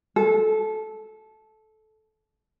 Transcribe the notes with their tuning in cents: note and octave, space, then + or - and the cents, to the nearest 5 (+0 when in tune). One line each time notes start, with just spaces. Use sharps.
A4 -15